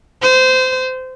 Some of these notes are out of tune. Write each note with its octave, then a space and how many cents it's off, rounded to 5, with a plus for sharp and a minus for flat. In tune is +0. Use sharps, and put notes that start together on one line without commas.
C5 -25